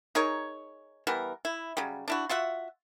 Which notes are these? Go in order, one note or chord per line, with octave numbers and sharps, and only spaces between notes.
D#4 G#4 A#4 C#5
E3 G3 B3 A#4
E4
C#3 F#3 G3
D4 E4 F#4
F4 F#4 E5 F#5